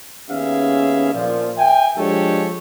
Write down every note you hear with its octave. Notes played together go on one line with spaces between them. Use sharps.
D#2 B3 C#4 G#4 E5 F5
A#2 F3
E5 G5 G#5
F3 G#3 D4 G4 A4 C#5